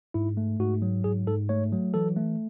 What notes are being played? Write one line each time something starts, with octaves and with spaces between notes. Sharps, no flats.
G#2 E4
A3
G#2 F#4
F#3
G#2 G#4
G#2 A4
A3 C#5
F#3
E3 A4
A3